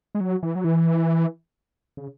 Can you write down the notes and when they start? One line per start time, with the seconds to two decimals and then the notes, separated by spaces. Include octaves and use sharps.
0.15 G#3
0.20 F#3
0.43 E3
0.55 F#3
0.64 E3
1.97 C#3